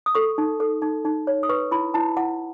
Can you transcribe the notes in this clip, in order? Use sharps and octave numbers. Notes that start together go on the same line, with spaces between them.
D#6
A4 C#6
D#4
A4
D#4
D#4
C#5
D#6
B4 C#6
E4 B5
E4 A5
E4 F#5